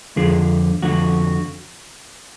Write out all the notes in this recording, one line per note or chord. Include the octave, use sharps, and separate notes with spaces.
F2 D3 F3 G#4
F2 D3 F3 F#4